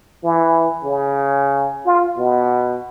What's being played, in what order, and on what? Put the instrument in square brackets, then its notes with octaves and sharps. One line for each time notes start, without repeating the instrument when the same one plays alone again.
[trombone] E3
C#3
F4
B2